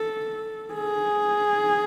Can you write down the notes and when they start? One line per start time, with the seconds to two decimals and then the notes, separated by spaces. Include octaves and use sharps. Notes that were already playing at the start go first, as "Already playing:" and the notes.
Already playing: A4
0.74 G#4